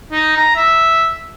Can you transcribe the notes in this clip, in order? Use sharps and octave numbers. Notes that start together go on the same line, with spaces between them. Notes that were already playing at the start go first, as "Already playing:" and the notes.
D#4
A#5
E5